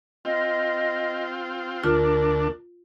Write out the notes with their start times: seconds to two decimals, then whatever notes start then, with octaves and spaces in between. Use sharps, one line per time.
0.25 C4 F4 D#5
1.84 D2 D4 F4 A#4